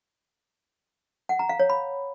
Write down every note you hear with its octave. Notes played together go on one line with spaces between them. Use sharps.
F#5
A#5
F5
C#5
B5